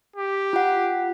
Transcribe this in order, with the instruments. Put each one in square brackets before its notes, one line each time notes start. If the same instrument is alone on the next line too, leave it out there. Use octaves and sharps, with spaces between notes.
[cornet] G4
[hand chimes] F4 F#5